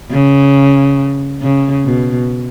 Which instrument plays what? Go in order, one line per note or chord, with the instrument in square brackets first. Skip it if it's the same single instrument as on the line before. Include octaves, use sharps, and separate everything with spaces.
[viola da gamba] C#3
C#3
B2